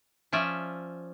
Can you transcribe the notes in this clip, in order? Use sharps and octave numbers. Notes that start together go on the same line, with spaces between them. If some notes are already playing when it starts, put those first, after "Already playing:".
F3 C#4 D5 E5